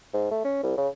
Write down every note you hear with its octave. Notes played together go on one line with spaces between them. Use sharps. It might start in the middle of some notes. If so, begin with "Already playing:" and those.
G#2
A3
C#4
C2
C#3